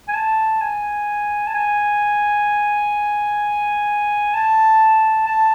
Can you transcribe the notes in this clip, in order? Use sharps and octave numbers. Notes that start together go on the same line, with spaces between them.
G#5
A5
G#5
A5
G#5
A5
A5